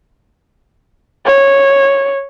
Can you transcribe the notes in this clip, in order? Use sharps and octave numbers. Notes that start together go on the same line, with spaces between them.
C#5